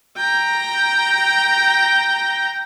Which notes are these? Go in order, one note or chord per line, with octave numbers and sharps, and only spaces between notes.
G5 A#5